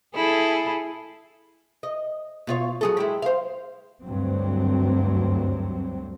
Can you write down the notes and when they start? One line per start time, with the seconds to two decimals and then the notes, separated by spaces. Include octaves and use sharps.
0.15 E4 G#4 A4
1.83 D#5
2.47 B2 F4 C#5
2.81 F#3 G#4 A4
2.97 G#3 E4 G4
3.22 C5 F5
4.04 D2 G2 F#3 C4